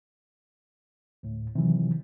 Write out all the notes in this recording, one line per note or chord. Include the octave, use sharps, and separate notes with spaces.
D2 A2
C3 D#3 E3 F#3